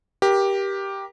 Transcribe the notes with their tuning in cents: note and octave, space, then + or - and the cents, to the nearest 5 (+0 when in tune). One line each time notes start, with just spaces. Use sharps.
G4 +0 A#4 +25